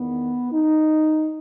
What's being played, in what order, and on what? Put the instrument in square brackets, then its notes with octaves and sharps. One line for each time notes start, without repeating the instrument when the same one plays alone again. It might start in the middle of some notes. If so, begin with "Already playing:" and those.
Already playing: [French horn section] E2 D#3 B3
D#4